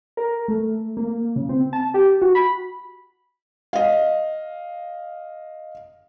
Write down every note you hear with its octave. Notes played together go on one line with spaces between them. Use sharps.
A#4
A3
A#3
C#3
C4
A5
G4
F#4
B5
D#5 F5